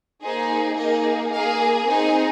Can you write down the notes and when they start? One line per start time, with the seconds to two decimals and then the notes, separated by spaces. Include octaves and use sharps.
0.23 A#3 D#4 G#4 C5
0.77 A#3 D#4 G#4 D#5
1.32 A#3 G#4 F5
1.86 C4 D#4 G#4 G#5